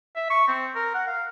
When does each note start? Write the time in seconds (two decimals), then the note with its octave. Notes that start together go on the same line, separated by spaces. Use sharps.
0.16 E5
0.30 C#6
0.48 C4
0.75 A#4
0.94 F#5
1.07 F5